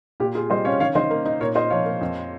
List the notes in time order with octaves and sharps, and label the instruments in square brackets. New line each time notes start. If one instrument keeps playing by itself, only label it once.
[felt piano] A#2 [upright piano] G4
[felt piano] F4 [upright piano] G#4
[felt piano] G3 [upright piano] C5 D#5
[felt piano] C#4 [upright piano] C#5 F5
[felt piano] D#3 [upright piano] C#5 F5
[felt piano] D#3 [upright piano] C5 D#5
[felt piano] A#3
D#4
[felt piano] A#2 [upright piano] A#4 C#5
[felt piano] F4 [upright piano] C5 D#5
[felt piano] F3 [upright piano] C#5 F5
[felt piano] A#3
F2